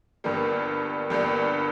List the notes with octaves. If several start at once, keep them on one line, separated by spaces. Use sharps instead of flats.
G1 G2 G3 A#3
G1 G2 G3 A#3